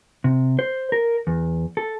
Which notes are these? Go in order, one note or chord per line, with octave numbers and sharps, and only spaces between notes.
C3
C5
A#4
E2
A4